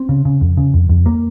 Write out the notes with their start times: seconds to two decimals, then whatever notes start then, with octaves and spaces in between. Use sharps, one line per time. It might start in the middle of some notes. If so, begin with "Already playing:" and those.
Already playing: C4
0.09 C#3
0.25 C#3
0.41 F2
0.57 C#3
0.74 F2
0.89 F2
1.06 A#3